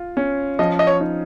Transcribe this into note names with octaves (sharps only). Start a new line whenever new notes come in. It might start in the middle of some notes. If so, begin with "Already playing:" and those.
Already playing: F4
C#4
F3 D#5
D#5
C#5
D#4